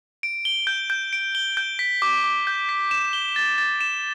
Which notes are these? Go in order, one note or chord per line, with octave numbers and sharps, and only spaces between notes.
D7
G7
G6
G6
D7
G7
G6
B6
D6
D6
G6
B6
E7
G7
A6
A6
E7